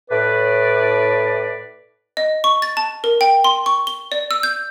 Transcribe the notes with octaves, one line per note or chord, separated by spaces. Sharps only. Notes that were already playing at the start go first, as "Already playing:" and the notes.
A2 B4 D5
D#5
C#6
A6
A5
A#4
G5
C6
C#6
G7
D5
E6
G6